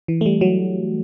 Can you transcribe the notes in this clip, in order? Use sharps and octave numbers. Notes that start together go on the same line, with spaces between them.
E3
A3
G3
F#3